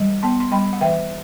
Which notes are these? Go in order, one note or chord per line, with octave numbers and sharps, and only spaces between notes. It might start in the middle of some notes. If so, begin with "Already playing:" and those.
Already playing: E3 G3
B3 A5 C6
C6
G3 G5 B5
F#5
E3 E5 G5